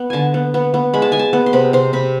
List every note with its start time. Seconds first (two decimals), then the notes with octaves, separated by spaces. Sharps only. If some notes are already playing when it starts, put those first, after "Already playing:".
Already playing: B3
0.10 D3 G#5 A5
0.34 B3
0.54 B3
0.74 B3
0.94 G#3 B5
1.02 A5
1.12 G#3 G#5
1.19 A5
1.33 B3
1.46 C6
1.53 C3 B5
1.73 C3 C6
1.93 C3 B5